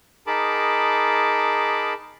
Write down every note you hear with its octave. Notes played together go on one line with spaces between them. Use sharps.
D#4 G#4 A#4 A5 B5 D6